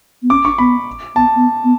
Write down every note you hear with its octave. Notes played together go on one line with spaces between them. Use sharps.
B3
C#4 D6
D4 C#6
B3 B5
B3 A5
B3
B3